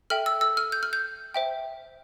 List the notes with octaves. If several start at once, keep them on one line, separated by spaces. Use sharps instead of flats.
A4 E5 G5 F6
E6
E6
F6
G6
F6
G6
C5 E5 G5